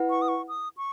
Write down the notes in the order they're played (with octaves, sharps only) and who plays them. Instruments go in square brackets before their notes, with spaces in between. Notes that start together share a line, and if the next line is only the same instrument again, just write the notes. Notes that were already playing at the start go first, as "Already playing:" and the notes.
Already playing: [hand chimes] E4 B4 F#5
[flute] C#6
D#6
C#6
D#6
C#6